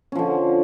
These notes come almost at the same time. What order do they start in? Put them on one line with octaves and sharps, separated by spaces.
C#4 F3 D3